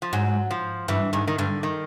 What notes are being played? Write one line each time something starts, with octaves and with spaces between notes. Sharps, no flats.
F3
G#2 F#3
F3
G2 E3
G#2 D#3
D#3
G2 D3
D#3